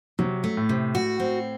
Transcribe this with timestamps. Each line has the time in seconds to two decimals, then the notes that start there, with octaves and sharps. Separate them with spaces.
0.19 C3 F#3
0.44 A3
0.57 A2
0.69 C3
0.95 F#4
1.20 C4